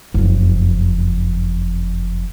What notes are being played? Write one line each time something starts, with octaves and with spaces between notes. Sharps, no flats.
F#1 F2